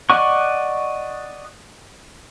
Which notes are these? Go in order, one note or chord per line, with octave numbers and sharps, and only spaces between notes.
D5 D#5 F#5 C#6